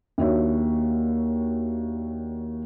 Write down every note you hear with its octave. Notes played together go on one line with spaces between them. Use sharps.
D#2 D4 F#4 C#5 E5